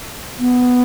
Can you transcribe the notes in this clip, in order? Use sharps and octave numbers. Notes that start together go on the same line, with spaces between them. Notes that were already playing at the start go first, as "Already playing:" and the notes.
B3